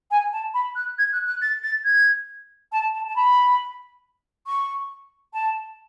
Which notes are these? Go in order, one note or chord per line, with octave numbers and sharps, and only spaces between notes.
G#5
A5
B5
F#6
G#6
F#6
F#6
A6
A6
G#6
A5
A5
A5
B5
C#6
A5